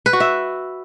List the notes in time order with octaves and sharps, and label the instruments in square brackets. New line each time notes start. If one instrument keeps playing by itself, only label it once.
[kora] B4
F#4
E5